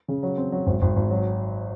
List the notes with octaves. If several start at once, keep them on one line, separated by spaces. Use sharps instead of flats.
C#3
F#3
C4
F#3
G#1
G#1
G#1
F#3